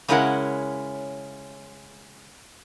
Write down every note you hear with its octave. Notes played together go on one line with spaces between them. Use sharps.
C#3 G#3 C#4 E4 A#4 F#5